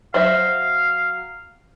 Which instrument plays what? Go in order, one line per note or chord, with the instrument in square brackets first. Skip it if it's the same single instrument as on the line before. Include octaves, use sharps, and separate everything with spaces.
[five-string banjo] F#3 C5 E5 [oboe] F5